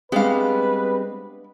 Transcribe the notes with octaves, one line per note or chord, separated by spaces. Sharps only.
G3 G#3 B3 C4 D4 B4 F5